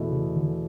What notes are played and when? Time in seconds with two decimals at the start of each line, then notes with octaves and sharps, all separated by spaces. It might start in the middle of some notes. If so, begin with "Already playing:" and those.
Already playing: E2 B2 A3 E4
0.10 C#3
0.35 D3